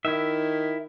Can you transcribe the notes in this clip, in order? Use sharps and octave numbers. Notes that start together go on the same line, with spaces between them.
D#3 E4 E5